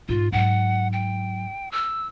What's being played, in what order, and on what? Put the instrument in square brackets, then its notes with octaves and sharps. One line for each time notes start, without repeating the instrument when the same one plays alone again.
[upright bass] G#2 [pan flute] F4
[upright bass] G#2 F#3 [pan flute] F#5
[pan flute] G5
E6